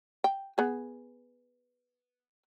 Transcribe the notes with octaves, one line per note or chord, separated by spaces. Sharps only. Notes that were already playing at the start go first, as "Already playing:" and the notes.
G5
B3 G#4